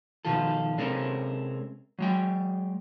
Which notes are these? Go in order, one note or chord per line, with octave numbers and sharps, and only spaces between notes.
B2 D#3 F3 F4 A4
C3 G#3 C4 C#4 A4 A#4
F#3 G#3 G5